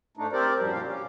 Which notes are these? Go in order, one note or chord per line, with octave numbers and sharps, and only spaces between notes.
G#2 A3 D4 D#4
C4 G4 A#4 C5 D5
F#2 A2 F3 G3
B2 A#3 D4 G4 F5
C#4 G4